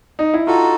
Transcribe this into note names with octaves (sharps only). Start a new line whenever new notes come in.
D#4
E4
D#4 F4 F#4 A4